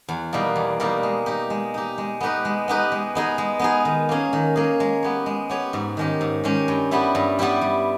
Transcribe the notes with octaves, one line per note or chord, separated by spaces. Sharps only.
E2
B2 G3 A#3 D#4
E2
B2 G3 A#3 D#4
G#3
D#4 G4
G#3
D#4 G4
G#3
B3 D#4 G4 B4
G#3
B3 D#4 G4 B4
G#3
B3 D#4 G#4
G#3
B3 D#4 G#4
D#3
A#3 C#4 G#4
D#3
A#3 C#4 G#4
G#3
B3 G4 C#5
G#3
B3 G4 C#5
G#2
D#3 G#3 C#4 G4
G#2
D#3 G#3 C#4 G4
G2
G3 B3 E4 G4
G2
G3 B3 E4 G4
G3